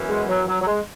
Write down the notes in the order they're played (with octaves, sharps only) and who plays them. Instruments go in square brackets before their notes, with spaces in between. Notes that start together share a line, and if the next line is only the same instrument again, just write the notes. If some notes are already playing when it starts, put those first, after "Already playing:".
Already playing: [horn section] F#2 E3 B3 E4
[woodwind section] G#3
F#3
F#3
F#3
G#3